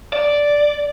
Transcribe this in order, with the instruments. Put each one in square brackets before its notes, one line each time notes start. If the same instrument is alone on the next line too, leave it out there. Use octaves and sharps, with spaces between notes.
[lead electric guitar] D5